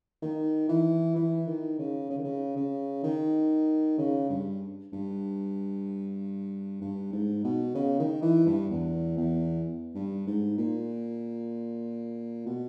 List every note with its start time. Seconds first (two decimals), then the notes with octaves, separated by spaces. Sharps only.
0.22 D#3
0.69 E3
1.16 E3
1.47 D#3
1.79 C#3
2.10 C#3
2.18 D#3
2.24 C#3
2.57 C#3
3.04 D#3
3.98 C#3
4.30 G2
4.93 G2
6.82 G2
7.13 G#2
7.45 B2
7.75 C#3
8.00 D#3
8.22 E3
8.47 G2
8.70 E2
9.17 E2
9.95 G2
10.27 G#2
10.58 A#2
12.47 B2